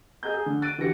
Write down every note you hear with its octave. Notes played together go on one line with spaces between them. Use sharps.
G#4 D#5 A#5 G6
G#4
D3
F#6 A6 D7 D#7
D3 E3 F#4 G4 A#6 C#7